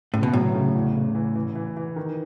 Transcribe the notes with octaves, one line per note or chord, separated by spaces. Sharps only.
A2 C#3
B2
A2 F#3
C#3
E2
C#3
E3
E3
E3
E3
D#3